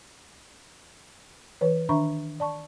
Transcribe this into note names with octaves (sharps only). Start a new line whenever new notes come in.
E3 B4 C#5
D#3 D4 E5 A#5 B5 C#6
D5 A5 C#6